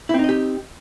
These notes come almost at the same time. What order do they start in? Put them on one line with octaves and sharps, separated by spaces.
E4 C4 D#4 D#5 G4